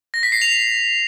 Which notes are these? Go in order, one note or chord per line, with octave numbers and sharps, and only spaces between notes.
A#6
B6
C7
F7